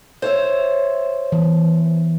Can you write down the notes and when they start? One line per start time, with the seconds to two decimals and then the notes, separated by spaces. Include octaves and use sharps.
0.22 C5 C#5 E5
1.32 E3